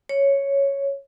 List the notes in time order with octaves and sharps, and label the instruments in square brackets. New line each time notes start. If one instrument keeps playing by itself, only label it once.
[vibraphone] C#5